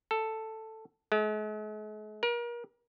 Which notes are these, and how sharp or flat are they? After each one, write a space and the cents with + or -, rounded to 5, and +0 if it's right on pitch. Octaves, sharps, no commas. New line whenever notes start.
A4 +5
G#3 +45
A#4 +35